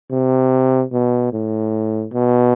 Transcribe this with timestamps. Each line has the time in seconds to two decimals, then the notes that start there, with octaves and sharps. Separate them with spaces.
0.11 C3
0.92 B2
1.33 A2
2.13 B2